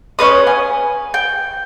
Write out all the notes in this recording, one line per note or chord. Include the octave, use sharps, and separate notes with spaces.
C#4 D#4 B4 D#6
G#5
G5